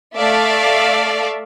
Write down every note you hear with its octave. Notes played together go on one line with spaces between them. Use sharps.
A3 A4 D5 E5 F5